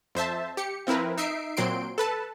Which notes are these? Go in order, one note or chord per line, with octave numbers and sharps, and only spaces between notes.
F2 C5 E5 A5
G4 C#7
F3 C4 E4 A#4 B4
D#4 E5 C7 D7
A#2 F#3 C4 C6 D7
A4 B4 A5